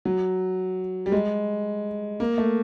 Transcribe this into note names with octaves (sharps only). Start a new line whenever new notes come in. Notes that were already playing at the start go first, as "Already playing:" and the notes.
F#3
G3
G#3
A#3
A3